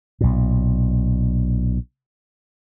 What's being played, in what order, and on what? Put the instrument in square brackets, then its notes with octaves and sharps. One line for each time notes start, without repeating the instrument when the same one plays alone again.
[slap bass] B1 A#2